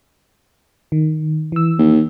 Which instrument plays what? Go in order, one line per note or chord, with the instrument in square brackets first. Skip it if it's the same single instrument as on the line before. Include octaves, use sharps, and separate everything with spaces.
[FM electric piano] D#3
E3 E6
[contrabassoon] D#2